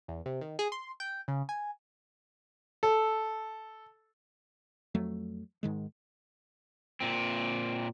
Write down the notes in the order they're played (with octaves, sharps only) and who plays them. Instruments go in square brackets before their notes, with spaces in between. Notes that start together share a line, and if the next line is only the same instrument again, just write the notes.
[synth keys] E2
C3
D#3
G#4
C6
G5
C#3
G#5
[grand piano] A4
[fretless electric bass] F2 F#3 A3
G#2 D#3 G#3
[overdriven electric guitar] A#2 C4